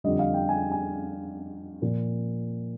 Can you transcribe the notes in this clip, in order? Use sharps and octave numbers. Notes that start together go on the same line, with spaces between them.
F2 D3 G3 D#5
F5
G5
G#5
G#5
A#2 F3